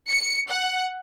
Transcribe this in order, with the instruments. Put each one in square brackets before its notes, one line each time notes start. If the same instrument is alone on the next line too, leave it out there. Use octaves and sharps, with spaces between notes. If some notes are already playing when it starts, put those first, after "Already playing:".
[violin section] C#7
F#5